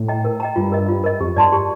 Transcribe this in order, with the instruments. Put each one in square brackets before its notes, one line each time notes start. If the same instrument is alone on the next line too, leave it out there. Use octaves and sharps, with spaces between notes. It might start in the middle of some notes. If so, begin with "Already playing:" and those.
Already playing: [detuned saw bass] A2
[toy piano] D#5 G5 A#5
A#4
D#5 G5 A#5
[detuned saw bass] G2 [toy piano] F4
[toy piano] A#4 D#5
F4
A#4 D#5
[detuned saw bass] F2 [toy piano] G4
[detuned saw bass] G2 [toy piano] D5 A5 C6
[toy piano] G4